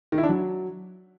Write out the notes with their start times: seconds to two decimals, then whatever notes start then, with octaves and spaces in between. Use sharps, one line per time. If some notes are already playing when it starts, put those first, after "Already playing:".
0.12 D#3
0.18 E4
0.23 D4
0.29 F#3